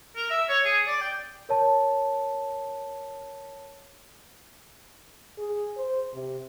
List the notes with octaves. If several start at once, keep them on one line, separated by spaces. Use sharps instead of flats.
A#4
E5
C#5
G#4
D5
G5
A#4 C#5 A5
G#4
C5
C3